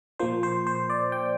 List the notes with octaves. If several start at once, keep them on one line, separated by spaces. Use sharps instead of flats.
A#2 F3 A#3 C5
C5
C5
D5
G5